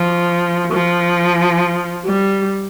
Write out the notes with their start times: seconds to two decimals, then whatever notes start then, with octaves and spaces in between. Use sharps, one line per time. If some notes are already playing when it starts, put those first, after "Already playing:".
Already playing: F3
0.73 F3
2.05 G3